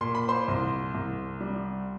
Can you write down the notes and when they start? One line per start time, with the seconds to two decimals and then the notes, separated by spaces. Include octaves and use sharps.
0.01 A#2 C6
0.15 B5
0.28 C5 C6
0.48 C2
0.94 C2
1.41 G3